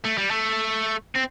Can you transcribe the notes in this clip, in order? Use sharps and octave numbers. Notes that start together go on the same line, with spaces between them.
A3
G3
A3
C4